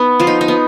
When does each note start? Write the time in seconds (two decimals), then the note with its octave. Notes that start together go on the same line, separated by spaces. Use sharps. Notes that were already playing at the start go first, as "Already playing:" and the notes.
Already playing: B3 D#4
0.20 F3 F4
0.27 D#4
0.41 D#4
0.48 B3